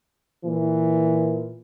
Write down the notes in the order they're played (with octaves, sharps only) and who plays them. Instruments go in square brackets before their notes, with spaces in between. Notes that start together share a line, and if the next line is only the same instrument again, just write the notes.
[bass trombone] A#2 [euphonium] E3